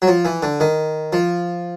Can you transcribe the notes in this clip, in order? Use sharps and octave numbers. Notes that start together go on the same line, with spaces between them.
F#3
F3
E3
D3
D#3
F3